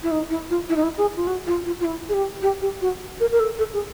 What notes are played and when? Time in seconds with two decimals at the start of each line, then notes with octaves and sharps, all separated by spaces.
0.03 E4
0.11 D#4
0.30 E4
0.50 F4
0.69 E4
0.76 D#4
0.83 E4
0.98 G#4
1.16 F4
1.27 F#4
1.47 F4
1.66 F4
1.80 F4
1.85 E4
2.09 G#4
2.14 G4
2.42 G4
2.62 G4
2.81 F#4
3.20 A#4
3.32 A#4
3.40 A4
3.59 A4
3.73 G#4